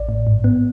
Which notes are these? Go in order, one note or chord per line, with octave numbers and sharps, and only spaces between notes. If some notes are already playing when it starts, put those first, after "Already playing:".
Already playing: A1 D5
A2
G#2
B3